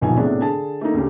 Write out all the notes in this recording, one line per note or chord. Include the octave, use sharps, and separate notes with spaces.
D#1 B1 D#3 F3 B3 G#5
A2 C3 A3 B3 D4 G#4
D3 G#4 A5
A3 A#3 D#4
D2 C#3 G4